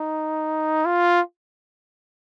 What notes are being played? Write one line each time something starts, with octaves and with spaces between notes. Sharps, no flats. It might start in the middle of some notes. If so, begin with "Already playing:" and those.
Already playing: D#4
F4